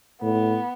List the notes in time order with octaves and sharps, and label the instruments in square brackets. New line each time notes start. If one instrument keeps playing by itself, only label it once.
[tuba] A2 [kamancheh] B3